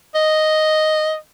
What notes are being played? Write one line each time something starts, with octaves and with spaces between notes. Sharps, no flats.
D#5